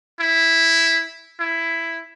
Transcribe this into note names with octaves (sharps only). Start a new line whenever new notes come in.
E4
E4